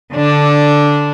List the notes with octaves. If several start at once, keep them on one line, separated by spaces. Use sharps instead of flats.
D3 D4